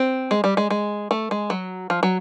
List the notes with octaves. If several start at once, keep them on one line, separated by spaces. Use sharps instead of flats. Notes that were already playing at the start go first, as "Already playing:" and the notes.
Already playing: C4
G#3
G3
G#3
G#3
A3
G#3
F#3
F3
F#3